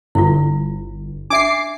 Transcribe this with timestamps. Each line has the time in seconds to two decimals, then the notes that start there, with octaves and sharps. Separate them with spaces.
0.15 G1 E4 F4
1.30 D4 E5 D6 C7